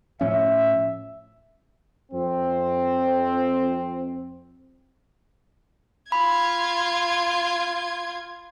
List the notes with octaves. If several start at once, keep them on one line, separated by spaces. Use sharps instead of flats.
A2 F3 C#4 E5
F2 C4
F4 B5 G#6